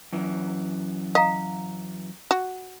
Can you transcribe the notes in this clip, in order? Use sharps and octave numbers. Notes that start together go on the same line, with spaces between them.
F#2 E3
D#5 F5 A#5
F#4